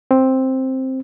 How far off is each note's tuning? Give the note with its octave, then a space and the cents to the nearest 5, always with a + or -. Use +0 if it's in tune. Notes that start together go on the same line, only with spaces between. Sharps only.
C4 +5